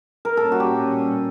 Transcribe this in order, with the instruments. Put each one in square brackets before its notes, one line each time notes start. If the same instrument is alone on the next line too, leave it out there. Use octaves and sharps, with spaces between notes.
[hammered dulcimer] A#4
[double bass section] A#2 G3 A#3 C#4 [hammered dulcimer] A4
[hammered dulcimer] F#4
G4